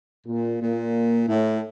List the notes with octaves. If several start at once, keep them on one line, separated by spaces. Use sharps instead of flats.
A#2
A#2
A2